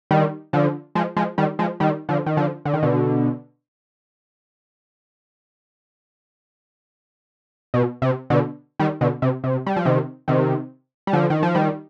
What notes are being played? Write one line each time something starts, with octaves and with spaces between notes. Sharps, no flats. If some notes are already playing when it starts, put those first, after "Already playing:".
D#3 G3
D3 F3
F3 G#3
F3 G#3
D#3 G3
F3 G#3
D#3 G3
D3 F3
D#3
D3 F3
D3
D#3
B2 D3
B2
C3
B2 D3
D#3 G3
B2 D3
C3
C3
G3
F3
C3 D#3
C3 D#3
G3
D3 F3
D#3
F3
D#3 G3